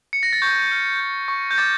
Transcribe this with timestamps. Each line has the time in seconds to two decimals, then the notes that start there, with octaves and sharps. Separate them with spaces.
0.13 C#7
0.23 A#6
0.33 A6
0.42 C#6 G6
0.72 F6
1.00 G6
1.28 C#6
1.51 G6
1.58 D6 A6